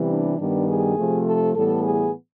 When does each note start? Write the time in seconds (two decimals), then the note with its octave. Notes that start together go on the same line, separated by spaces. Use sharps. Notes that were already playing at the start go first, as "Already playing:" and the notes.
Already playing: C3 E3 G3 B3
0.10 D4
0.38 G2 D#3 G3 B3 D4
0.68 G#4
0.97 C3 F3 A3
1.26 A4
1.54 A2 E3 G3 B3 A4
1.83 G#4